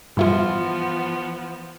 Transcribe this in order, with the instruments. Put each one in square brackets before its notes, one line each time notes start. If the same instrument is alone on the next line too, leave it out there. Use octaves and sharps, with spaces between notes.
[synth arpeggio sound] G2 E4 F4 [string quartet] E3 F3 B3